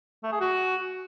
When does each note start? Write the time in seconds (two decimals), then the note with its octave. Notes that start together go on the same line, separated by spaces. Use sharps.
0.23 A3
0.32 G#4
0.41 F#4